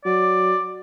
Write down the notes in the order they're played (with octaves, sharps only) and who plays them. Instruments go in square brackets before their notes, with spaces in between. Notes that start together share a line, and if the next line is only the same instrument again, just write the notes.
[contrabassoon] F#3 [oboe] D5